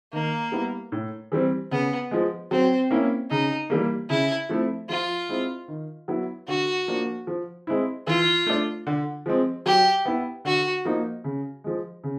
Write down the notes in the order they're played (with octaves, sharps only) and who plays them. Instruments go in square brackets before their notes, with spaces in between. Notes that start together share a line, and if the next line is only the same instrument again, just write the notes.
[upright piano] D#3 [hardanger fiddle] A#3
[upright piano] G3 B3 E4
A2
E3 G3 C4
[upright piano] C#3 [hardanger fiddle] B3
[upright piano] F3 G#3
[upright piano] F#3 [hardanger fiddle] C4
[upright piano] A#3 C#4 E4
[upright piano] C#3 [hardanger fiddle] D#4
[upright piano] E3 G3 A#3
[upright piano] C#3 [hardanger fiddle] E4
[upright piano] F3 A3 C4 E4
[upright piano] F3 [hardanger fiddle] F4
[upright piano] G#3 C4 E4
D#3
F#3 B3 E4
[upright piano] D3 [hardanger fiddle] F#4
[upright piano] F3 A#3 D4
F3
G#3 C4 E4
[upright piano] E3 [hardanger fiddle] F4
[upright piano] A3 D4
D3
F3 G#3 C4
[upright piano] F#3 [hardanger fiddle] G4
[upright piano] B3 E4
[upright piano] D3 [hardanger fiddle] F#4
[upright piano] F3 A#3 D#4
C#3
F3 G#3
C#3